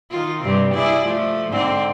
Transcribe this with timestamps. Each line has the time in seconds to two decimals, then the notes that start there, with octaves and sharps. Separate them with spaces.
0.11 D#3 F4
0.42 G2 C3 C4
0.73 E4 G#4 D5
1.05 F3 A3
1.50 G#2 D3 C4